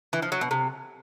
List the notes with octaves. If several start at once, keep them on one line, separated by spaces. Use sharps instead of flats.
E3
F3
F#3
B2
C3